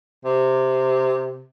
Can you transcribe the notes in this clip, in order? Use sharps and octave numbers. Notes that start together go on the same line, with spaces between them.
C3